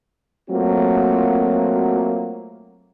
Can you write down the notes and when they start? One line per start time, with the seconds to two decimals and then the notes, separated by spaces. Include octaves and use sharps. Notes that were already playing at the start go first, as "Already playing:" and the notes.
0.51 F#3 A3 A#3 C4 F4 F#4